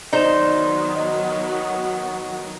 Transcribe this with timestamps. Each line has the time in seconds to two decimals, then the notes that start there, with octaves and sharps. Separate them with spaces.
0.13 D#3 F#3 B3 D#4 C5 D5 E7
0.96 F#4 D#5